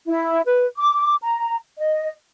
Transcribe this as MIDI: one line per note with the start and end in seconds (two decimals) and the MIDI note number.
0.07 0.41 64
0.46 0.65 71
0.77 1.15 86
1.22 1.56 82
1.78 2.10 75